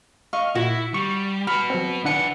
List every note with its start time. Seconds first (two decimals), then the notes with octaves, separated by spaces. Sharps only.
0.33 D#5 F5 C#6
0.55 A#2 E4 F#4
0.94 G3 C#6
1.47 F#4 B4 B5 F6
1.70 F#3 C4
2.05 D#3 D4 B4 F#5 C#7